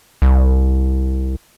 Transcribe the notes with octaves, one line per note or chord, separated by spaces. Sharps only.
C2